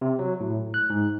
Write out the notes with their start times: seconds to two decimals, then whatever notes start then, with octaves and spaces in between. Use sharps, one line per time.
0.01 C3
0.19 F#3
0.40 A2
0.74 F#6
0.90 G#2